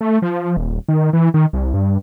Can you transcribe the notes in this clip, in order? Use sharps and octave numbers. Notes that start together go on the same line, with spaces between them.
A3
F3
D#1
D#3
E3
D#3
C2
G2